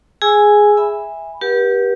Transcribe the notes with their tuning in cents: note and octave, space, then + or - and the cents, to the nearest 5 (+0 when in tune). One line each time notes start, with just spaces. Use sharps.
G#4 +0 G#5 +0 E6 +0
E5 -5 G#5 -20 B5 +0
G4 +0 B4 -40 F#5 +0